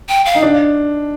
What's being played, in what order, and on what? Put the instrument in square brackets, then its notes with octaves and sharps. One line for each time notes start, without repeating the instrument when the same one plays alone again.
[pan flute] G5
F5
[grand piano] D#4
D4